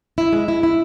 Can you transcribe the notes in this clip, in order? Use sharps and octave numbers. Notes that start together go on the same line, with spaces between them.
E4
G#3
E4
E4